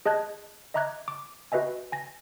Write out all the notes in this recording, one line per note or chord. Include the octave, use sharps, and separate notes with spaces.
G#4 D#5 A5 F#6 G#6
D#5 E5 A#5 D6 F#6 G#6
D6
F#4 B4 D#5 E5 G#5
G#5 A#6